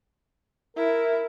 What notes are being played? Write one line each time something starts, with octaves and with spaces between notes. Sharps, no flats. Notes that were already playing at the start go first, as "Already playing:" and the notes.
E4 A#4